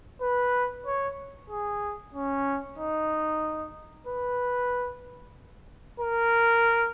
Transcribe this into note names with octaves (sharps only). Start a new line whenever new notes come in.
B4
C#5
G#4
C#4
D#4
B4
A#4